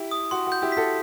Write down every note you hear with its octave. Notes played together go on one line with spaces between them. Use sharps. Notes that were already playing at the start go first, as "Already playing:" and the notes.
Already playing: E4 G4
D#6
F#4 C6
F#4
G6
E4 G4
F#4 A4 B6